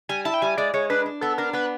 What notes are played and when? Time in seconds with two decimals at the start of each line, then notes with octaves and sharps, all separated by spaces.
0.09 G3 G#5
0.25 E4 A5
0.34 G5
0.42 G3 G#5
0.58 G#3 D5
0.74 G#3 C#5
0.90 D4 B4
1.06 D4
1.21 B3 A4
1.38 D4 A#4
1.53 B3 B4